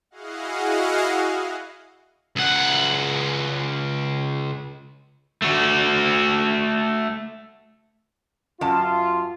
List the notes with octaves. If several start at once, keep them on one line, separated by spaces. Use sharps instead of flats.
E4 F#4 G#4 D#5 F5 F#5
C#2 F#5
A3 F#4
F#2 F4 A5